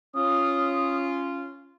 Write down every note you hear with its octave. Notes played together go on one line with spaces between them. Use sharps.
C#4 F4 D#6